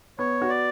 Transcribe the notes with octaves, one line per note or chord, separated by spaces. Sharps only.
B3 C#5
F#4
D5